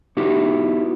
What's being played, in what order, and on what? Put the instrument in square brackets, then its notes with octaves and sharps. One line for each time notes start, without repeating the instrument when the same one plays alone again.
[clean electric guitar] B3 D#4 E4 F#4 G4